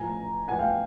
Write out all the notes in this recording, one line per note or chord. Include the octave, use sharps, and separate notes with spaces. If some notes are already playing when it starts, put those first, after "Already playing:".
Already playing: A2 F3 G#5 A#5
A2 F3 F#5 G#5
F5 G5